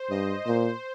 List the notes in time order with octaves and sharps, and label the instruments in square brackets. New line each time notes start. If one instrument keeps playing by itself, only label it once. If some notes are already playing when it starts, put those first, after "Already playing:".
Already playing: [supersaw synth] C5
[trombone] G2 [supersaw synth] D#5
[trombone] A#2 [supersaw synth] C5